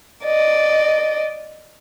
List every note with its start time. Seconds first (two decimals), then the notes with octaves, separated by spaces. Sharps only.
0.25 D5 D#5